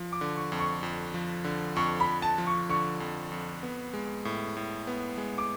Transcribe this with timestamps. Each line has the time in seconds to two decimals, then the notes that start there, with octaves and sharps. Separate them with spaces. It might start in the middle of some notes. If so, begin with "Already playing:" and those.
Already playing: F3
0.12 D6
0.21 D3
0.36 C#6
0.52 F2
0.59 C#6
0.83 F2
1.14 F3
1.44 D3
1.76 F2 C#6
2.00 B5
2.07 F2
2.22 A5
2.38 F3
2.46 C#6
2.69 D3 C#6
3.00 F2
3.32 F2
3.63 B3
3.94 G#3
4.25 A2
4.57 A2
4.87 B3
5.18 G#3
5.38 D6